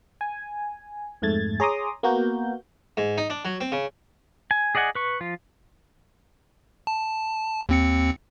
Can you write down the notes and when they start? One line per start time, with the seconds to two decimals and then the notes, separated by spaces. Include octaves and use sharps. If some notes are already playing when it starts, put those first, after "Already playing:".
0.21 G#5
1.22 F2 G#2 A3 G#6 A6
1.60 G#4 C#5 A#5 C6 D6 D#6
2.03 A#3 B3 F#4 A#4 G6
2.97 G#2
3.18 D#4
3.30 D4
3.45 F#3
3.61 C4
3.72 C#3
4.51 G#5
4.75 G#4 D5 D#5 F#5 G#5
4.95 B4 C#6
5.20 F3 F4
6.87 A5
7.69 D#2 C4 C#7